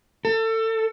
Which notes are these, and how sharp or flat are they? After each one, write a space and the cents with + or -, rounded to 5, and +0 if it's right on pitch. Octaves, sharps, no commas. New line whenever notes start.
A4 +30